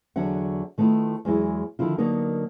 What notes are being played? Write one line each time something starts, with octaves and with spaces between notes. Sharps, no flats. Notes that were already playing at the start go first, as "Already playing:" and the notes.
E2 D3 F#3 D4 E5 F#5
D#3 A3 B3 E4 F4
E2 F#3 G#3 E4
D3 D#3 F3 E4 F4
D3 F#3 A#3 B3 D#4 A#4